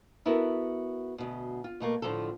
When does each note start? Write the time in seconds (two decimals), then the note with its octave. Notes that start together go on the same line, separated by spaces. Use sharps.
0.26 B3 E4 F#4 A4 A#4
1.18 D2 B2
1.64 F4
1.80 B2 A3 A#3
2.02 A2 D3 F3 F4 A4